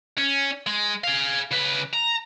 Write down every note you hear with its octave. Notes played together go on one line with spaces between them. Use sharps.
C#4
G#3
G#4 F5
C#3 B4
A#5